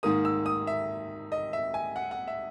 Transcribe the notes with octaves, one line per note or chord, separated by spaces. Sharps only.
G#2 D#3 A#3 D#6
E6
D#6
E5
D#5
E5
G#5
F#5
F#5
E5